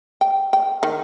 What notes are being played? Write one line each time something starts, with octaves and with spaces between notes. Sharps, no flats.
G5
G5
D#3